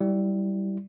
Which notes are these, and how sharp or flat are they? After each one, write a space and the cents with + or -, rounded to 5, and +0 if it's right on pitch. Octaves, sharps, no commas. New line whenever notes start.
G3 -10 E4 +0